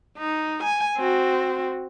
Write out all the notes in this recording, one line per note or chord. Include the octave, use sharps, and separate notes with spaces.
D#4
G#5
C4 F#4